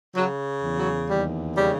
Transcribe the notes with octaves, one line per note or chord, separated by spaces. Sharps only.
C#3 F#3
E2
F#3
D#2 G3
C#3 G3